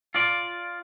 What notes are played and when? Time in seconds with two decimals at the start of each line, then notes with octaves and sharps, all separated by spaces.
0.15 F4 D5